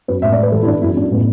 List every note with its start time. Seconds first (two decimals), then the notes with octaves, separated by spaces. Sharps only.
0.08 F#2 B4
0.22 A2 E5
0.32 D5
0.37 A2
0.43 B4
0.52 E3 A4
0.62 E4
0.67 E3 D4
0.82 F#2 E4
0.97 F#2 D4
1.11 A2 B3